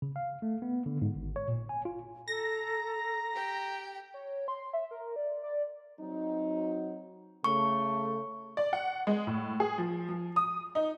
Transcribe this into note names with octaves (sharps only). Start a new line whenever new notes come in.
C#3
F5
A3
B3
D3
G#2
G#1
C#5
A#2
G#5
F4
A4 A#5 A#6
G4 G5
C#5
C6
E5
A#4
D5
D5
F#3 C4 D#4
C#3 A3 C#6
D5
F#5
G#3
A2
G#4
F3
F3
D#6
D#4